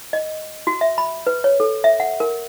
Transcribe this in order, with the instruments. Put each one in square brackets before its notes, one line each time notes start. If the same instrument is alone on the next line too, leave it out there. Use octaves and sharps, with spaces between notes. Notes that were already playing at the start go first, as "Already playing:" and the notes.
[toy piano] D#5
F#4
E5
B5
B4
C#5
A4
E5
F#5
A#4